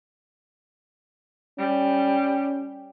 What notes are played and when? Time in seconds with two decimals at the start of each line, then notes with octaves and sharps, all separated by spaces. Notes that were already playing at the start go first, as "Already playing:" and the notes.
1.58 G3 C#4